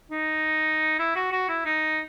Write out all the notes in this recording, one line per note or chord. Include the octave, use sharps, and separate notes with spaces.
D#4
E4
F#4
F#4
E4
D#4